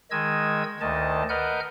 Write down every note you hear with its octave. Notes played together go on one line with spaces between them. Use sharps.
D#3 G#3 D#5 E6 G#6
D2 D#3 D#5 A5
A#4 B4 D#5 F#5 F6 G6